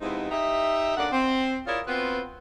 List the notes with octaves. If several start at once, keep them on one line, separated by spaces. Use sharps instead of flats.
G#2 C3 F3 B3 D#4 E4
D#4 G4 D#5 E5
F#2 D3 A#3 D5 F#5
C4
E4 F4 G#4 A#4 C#5 D5
B3 C4 F4 F#4 B4